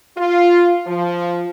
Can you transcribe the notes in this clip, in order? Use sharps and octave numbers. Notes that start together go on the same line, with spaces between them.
F4
F3